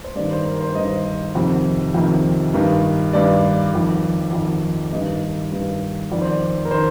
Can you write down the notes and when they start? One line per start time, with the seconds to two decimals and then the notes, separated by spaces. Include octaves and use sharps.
0.04 C5
0.15 G2 D#3 D5
0.31 C5
0.45 A#4
0.61 C5
0.75 G2 D#3 D#5
1.35 F2 C3 D#3
1.94 F2 C3 D#3
2.54 G2 D#3
3.13 G2 D#3 D5
3.73 F2 D#3
4.33 F2 D#3
4.93 G2 D#3 D#5
5.52 G2 D#3
6.12 F2 D#3 D5
6.22 C5
6.31 D5
6.65 A#4
6.71 D#3 C5